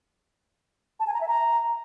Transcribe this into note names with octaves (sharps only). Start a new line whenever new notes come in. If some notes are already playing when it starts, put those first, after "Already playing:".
A5
G#5
A#5
E5
A#5